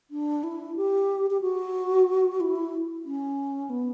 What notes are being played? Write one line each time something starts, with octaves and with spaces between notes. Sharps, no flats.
D4
E4
G4
G4
F#4
E4
C#4
B3